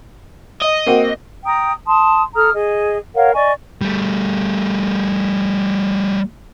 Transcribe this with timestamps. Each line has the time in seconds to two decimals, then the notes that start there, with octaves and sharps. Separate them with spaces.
0.62 D#5
0.86 A#3 C4 F#4
1.45 G5 A#5 D#6
1.86 A5 C6 D#6
2.35 A4 A#5 D#6 F6
2.53 G#4 D#5
3.14 A#4 C#5 F5 F#5
3.33 D5 D#5 G#5 C#6
3.81 G3 A3